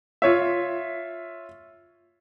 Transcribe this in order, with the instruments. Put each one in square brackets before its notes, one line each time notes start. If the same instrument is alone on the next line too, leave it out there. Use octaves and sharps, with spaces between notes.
[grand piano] F4 C#5 E5